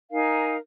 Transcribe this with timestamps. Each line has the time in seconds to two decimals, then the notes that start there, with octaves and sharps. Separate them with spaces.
0.10 D#4 A#4 F5 G#5